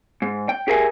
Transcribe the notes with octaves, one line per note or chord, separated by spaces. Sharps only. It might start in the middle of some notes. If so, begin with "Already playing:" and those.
G#2
G5
G4 G#4 A#4 E5 F5 G#5